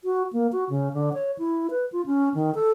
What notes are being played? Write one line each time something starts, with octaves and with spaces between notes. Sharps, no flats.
F#4
A#3
F#4
C#3
D3
C#5
E4
B4
F4
C#4
D#3
A4